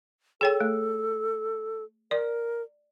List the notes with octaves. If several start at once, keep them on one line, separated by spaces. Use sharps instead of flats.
G#4 A4 C#5 G5
A3
A#4 D5